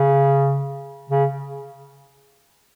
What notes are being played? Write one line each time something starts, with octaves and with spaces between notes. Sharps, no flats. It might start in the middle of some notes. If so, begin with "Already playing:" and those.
Already playing: C#3
C#3